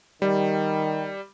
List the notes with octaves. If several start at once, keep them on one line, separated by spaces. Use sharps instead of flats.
D#3 G3